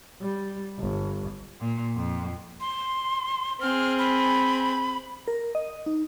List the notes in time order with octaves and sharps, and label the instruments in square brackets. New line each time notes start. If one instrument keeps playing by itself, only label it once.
[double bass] G3
G1
[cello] A#2
F2
[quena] C6
[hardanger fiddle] C4 G#4 [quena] F6
[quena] B5
[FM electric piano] A#4
D#5
D#4